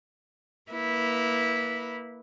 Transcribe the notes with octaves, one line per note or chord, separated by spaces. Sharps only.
A#3 E4 B4